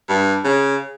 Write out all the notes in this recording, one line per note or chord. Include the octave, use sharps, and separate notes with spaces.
G2
C#3